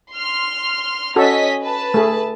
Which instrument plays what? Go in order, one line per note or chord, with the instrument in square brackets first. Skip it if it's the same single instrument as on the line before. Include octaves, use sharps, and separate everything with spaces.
[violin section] C6 F6
[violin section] C#4 D#5 B6 [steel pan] F#4 A4
[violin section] B4 A5
[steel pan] A3 G#4